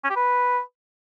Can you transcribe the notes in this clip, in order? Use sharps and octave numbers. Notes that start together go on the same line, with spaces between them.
C#4
G4
B4